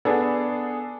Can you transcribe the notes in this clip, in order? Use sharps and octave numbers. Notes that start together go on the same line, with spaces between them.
B3 D4 G#4 A4